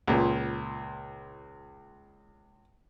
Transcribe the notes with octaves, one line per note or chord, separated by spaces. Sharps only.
C#2 A#2